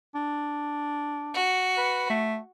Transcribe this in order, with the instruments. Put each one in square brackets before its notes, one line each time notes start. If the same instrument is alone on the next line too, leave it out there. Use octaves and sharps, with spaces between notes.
[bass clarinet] D4
[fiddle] F#4
[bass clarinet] B4
A3